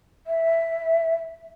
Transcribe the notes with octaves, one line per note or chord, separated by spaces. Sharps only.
E5